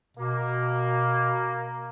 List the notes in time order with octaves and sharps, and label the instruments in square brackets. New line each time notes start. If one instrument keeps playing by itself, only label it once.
[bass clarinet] B2 [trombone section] A#3